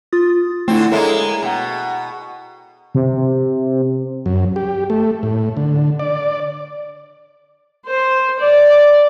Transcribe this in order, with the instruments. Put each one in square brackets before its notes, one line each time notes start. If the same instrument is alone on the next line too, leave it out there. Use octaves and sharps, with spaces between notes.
[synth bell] F4 D#6 A6
[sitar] D3 C4 [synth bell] A3 E4
[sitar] G#3 A#3 E4 [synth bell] A4 C#5 E5
[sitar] B2 [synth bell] F#5 G5 A#5
[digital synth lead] C3
[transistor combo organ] F#2
G4
A3
A2
D3
D5
[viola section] C5
D5